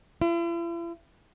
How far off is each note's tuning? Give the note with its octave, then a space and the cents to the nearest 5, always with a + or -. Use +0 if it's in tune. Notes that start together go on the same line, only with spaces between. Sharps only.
E4 +45